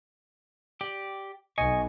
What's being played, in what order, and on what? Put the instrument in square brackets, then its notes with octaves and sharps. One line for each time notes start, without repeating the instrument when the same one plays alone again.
[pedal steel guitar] G4 D5
[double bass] B1 [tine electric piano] D#5 G#5 [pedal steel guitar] C#6